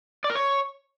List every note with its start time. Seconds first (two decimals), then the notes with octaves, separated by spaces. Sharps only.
0.24 D5
0.30 A#4
0.35 C#5